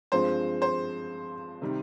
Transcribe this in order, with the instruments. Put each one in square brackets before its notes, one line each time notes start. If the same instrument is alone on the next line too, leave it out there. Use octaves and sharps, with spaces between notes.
[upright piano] G2 F3 G#3 C4 [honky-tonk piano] C5
[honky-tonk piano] C5
[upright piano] C3 D#3 G3